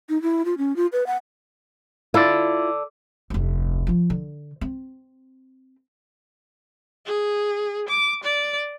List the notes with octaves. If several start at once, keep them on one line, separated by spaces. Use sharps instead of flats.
D#4
E4
F4
C#4
F4
B4
F#5
E4 F4 A4 D5
F1 D2
F3 F4
D3
C4
G#4
D6
D5